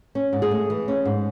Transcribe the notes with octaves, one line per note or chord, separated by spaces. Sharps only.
C#4
G#2
G#4
A3
E3
C#4
G#2